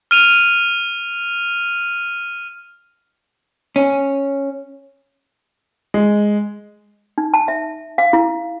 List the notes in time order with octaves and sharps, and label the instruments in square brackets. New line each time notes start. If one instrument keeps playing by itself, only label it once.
[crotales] F6 D#7 F7
[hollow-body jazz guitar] C#4
[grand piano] G#3
[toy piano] D#4
A5
E5
F5
E4